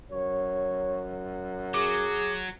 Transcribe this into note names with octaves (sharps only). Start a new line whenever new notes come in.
F#2 C#5
F#3 G#4 D6